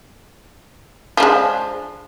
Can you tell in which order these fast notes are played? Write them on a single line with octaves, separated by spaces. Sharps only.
F3 D4 G#3